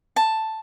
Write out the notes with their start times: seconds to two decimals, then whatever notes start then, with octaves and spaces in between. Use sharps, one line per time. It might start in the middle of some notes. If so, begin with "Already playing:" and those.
0.16 A5